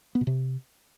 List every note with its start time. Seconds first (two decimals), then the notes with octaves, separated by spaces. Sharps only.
0.15 B3
0.21 B2
0.27 C3